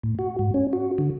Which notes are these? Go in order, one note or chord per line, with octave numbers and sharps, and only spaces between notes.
A2
F#4
G#2
C#4
F#4
D3